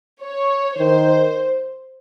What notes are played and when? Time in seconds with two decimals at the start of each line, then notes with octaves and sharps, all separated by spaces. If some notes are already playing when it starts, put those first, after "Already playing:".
0.22 C#5
0.77 D#3 C5